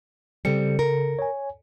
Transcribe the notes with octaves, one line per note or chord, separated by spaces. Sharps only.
C#3 G3 C4 A4 C#7
A#4
C#5 G#5